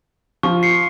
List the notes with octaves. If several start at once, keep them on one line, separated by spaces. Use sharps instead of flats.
F3 C#6
C7 C#7